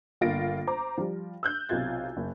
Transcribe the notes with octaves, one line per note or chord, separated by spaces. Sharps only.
G1 A#3 F4 A6 A#6 D7
C5 A#5 D6
F3 G3
E6 F#6 G6
B1 C3 F4 G#6 A6
F#1